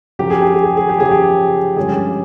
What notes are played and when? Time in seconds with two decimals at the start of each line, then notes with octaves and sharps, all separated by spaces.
0.19 F#2 C#3 F3 G4
0.30 G#4
0.42 G4
0.54 G#4
0.65 G4
0.77 G#4
0.89 G4
0.99 F#2 C#3 F3 G#4
1.11 G4
1.76 G2 D3 F3 G#3 C#4 G#4
1.96 G4